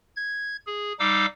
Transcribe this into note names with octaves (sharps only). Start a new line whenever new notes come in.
G#6
G#4
G3 D#4 F5 D6 E6